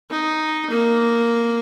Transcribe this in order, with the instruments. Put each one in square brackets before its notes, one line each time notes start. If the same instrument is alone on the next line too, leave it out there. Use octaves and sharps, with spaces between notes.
[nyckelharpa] D#4
A#3